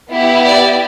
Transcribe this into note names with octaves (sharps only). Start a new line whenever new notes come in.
B3 E4 G4
D5